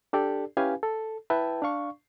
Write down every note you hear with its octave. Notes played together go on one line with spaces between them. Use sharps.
D4 G4 A4 D5
C#4 E4 G4 B4 F5 G#5
A4
E4 B4 E5 G5 A5
D4 D5 F5 C#6